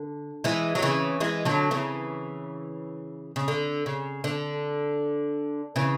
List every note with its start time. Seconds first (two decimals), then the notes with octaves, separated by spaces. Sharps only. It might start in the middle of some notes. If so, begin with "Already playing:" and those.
Already playing: D3
0.44 E3 G#3
0.75 F#3
0.82 C#3 E3
1.20 E3 G#3
1.45 D3 F#3
1.71 C#3 E3
3.36 C#3
3.48 D3
3.86 C#3
4.24 D3
5.76 C#3 E3